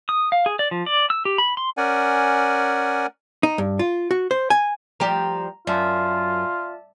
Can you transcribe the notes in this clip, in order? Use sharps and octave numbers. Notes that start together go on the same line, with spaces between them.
D#6
F5
G#4
D5
F3
D5
E6
G4
B5
C6
C#4 A#4 D5 F#5 G#5
D#4
G2
F4
F#4
C5
G#5
F3 G3 G4 A#5
F#2 F4 D5 E5 A5